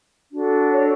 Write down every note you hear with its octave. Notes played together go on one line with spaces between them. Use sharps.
D4 F#4 A4
C#5